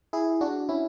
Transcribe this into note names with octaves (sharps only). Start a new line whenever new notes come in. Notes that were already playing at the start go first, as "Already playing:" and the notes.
E4 G#4
D4 F#4
C#4 E4